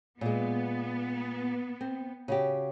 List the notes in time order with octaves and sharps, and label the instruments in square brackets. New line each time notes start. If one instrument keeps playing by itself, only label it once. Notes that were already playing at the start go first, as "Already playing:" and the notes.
[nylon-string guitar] A#2 G#3 [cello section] B3
[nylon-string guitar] C4
C#3 F#4 G4